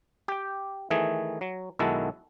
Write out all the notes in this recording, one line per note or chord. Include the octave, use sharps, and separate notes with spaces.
G4 G5
D#3 E3 A3 G#4
F#3
B1 D#3 G#3 E4 F#4 A4